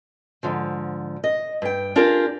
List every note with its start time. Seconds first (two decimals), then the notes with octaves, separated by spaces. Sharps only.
0.43 G#2 D3 F3
1.24 D#5
1.62 G2 G5
1.96 D4 F4 G4 G#4 A#4